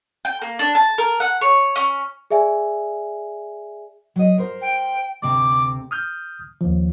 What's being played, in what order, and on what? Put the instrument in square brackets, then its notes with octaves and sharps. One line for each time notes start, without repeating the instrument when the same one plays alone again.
[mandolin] G5
A#3
D4
A5
A#4
F#5
C#5
C#4
[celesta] G#4 D5 E5 G#5
[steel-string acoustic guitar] F#3 D#5
A#4 C5
[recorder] G5
[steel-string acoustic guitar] D2 C3 [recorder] D6
[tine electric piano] D#6 F6 G6
D#2 F3